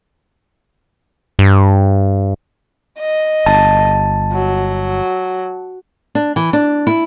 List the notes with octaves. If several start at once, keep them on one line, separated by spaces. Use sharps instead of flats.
G2
D#5
G1 A5
F#3
D4
E3
D4
E4